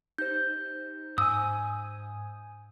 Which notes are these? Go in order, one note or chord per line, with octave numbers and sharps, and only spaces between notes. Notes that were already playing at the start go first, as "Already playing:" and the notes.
D#4 G4 C5 G6
G#2 G#5 D#6 E6